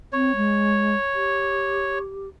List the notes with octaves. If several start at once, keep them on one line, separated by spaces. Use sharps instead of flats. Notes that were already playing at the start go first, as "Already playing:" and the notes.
C4 C#5
G#3
G4